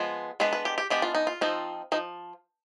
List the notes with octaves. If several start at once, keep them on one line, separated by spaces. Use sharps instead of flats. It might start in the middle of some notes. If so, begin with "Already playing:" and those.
Already playing: F3 G#3 B3
G#3 B3 D4 B4
B4
G4
G4
G#3 B3 D4 G4
F4
D#4
F4
F3 C4 D#4
F3 D#4